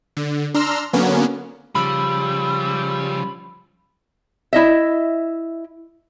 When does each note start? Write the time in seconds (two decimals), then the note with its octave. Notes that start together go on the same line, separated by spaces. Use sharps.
0.17 D3
0.54 D4 A#5 C6 E6 F6
0.93 D3 F#3 A#3 B3 C#4
1.75 C#3 F3 G3 B5 E6
4.53 E4 D#5 E5